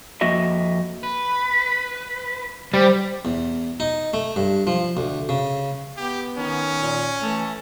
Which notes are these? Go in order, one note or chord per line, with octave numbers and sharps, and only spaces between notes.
F2 A#3 F#4 D#5 E5
B4
G3 C5
E2
D#4
A3
G2
F3
D2
C#3
B3 G4
D#3 C#4
A#2
E3 A3